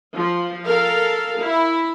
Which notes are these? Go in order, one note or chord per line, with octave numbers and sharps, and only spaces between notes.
F3
A4 A#4 F5
E4